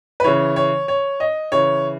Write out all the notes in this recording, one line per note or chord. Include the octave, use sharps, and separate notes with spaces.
B4
C#3 E3 C#5
C#5
C#5
D#5
C#3 E3 C#5